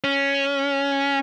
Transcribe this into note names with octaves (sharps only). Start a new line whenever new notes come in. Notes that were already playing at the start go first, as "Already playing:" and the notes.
C#4